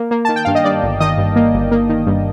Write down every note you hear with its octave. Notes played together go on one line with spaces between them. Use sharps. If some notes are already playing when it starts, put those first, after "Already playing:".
Already playing: A#3
A#3
D#3 A5
G5
G2 F5
D#5
G2 D5
G1
D#3 D#5
G2
A#3
G1
A#3
D#3
G2